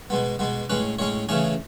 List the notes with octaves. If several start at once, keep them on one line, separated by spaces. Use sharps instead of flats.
B2 G#3 B3
B2 G#3 B3
A2 G#3 C#4 B4
A2 G#3 C#4 C#5
C#3 E3 A3 C#4 G#4